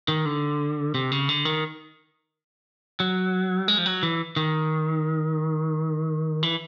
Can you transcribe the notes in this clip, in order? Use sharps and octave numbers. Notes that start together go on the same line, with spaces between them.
D#3
D3
C3
C#3
D3
D#3
F#3
G#3
F3
F#3
E3
D#3
E3